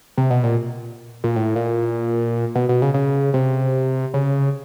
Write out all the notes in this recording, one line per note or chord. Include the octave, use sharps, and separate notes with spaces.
C3
B2
A#2
A#2
A2
A#2
B2
B2
C#3
C#3
C3
C#3